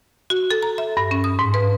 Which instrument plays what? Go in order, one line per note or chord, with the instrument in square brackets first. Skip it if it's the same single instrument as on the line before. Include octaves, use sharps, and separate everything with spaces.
[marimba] F#4
A4
A#5
E5
G2
C#4
D#6
G#2
B4